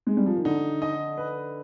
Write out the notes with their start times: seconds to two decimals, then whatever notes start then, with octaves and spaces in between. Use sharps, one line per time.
0.07 G#3
0.17 G3
0.26 F3
0.36 D#3
0.45 D3 D#4
0.82 D#5
1.17 B4